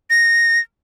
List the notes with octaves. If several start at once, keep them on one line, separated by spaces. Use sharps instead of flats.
A#6